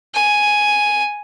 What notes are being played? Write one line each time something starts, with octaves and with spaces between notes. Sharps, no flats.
G#5